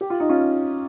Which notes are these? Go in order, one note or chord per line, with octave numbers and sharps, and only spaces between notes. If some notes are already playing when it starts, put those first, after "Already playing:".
G4
F4
D#4
C#4 F4